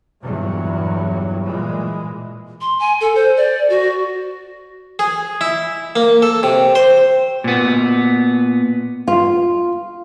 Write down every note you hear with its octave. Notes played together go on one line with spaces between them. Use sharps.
E2 G2 A#2 F#3
A#2 E3 G#3
C6
G#5
A4
C5
D5
F#4
G#4
E4
A#3
A4
C3
C5
A#2 B3
F4